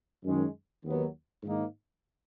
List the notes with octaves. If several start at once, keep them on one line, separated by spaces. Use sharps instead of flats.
F#2 D#3 G#3 C#4
D#2 D#3 F#3 B3
G#2 D#3 A#3 D#4